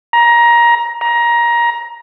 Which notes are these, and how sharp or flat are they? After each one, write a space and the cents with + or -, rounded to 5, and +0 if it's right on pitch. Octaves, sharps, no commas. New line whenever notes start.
A#5 +20
A#5 +20